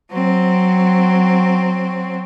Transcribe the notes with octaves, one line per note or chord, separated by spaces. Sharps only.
F#3 C4